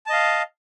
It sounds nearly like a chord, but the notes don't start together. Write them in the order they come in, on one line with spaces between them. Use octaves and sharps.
A5 D#5 F5